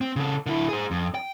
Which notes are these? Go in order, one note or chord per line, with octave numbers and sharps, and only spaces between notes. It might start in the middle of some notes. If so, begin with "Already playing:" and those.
C4
C#3 A4
D3 E4
G#4 C5
F2
G5